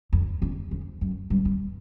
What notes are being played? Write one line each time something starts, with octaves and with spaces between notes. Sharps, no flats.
F2
E2
F2
F#2
G2
G2